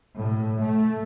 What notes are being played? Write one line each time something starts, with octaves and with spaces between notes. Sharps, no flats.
A2
A3